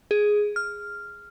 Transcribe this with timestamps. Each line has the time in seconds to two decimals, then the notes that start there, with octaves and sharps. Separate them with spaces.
0.11 G#4
0.56 F6